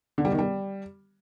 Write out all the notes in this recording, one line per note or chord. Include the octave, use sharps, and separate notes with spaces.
D3
G3
D#3
G3